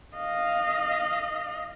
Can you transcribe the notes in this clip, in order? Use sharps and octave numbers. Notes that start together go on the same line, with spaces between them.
D#5 F5